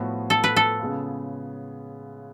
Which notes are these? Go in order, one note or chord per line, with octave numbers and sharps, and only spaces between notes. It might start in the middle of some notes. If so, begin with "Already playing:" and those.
Already playing: A2 F3 B3 F#4
A4
B4
A4
C#3 G#3 B3 F4